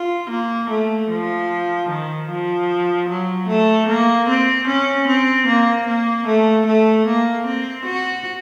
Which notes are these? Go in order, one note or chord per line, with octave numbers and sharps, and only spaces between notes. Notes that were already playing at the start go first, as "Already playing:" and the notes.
Already playing: F4
A#3
A3
F3
D#3
F3
F#3
A3
A#3
C4
C#4
C4
A#3
A#3
A3
A3
A#3
C4
F#4